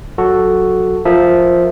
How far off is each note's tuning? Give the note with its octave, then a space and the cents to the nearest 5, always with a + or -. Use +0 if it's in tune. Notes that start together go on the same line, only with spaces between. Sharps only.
F#3 +0 F#4 +0 A4 +0
F3 +0 A#4 +0 E5 -10